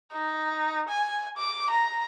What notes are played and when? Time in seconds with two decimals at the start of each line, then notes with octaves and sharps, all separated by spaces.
0.12 D#4
0.88 G#5
1.37 D6
1.70 A#5